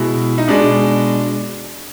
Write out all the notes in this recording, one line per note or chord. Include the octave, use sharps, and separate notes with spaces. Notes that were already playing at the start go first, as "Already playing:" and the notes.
Already playing: B2 G#3 E4
D#4
B2 G#3 D4